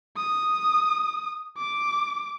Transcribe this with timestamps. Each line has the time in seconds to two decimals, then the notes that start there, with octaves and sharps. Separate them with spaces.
0.17 D#6
1.58 D6